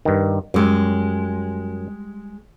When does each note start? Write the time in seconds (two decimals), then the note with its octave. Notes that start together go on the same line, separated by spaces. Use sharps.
0.05 G2 D#3
0.54 F#2 G3 G#3